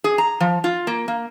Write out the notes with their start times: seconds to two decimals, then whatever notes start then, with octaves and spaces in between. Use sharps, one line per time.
0.04 G#4
0.18 A#5
0.40 F3
0.64 F4
0.87 A#3
1.08 A#3